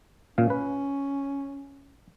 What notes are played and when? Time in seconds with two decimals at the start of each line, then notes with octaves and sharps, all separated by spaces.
0.38 A#2 C#4 F5
0.50 B4